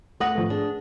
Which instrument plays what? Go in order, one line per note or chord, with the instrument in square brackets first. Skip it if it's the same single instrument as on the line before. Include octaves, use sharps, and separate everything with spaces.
[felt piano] A3 D#6 A#6 [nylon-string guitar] B4 F#5
[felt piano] F3 A3
[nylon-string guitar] D4 [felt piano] G#4